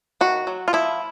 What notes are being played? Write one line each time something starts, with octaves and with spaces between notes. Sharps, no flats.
D#3 F#4
F#3
F4
F3 E4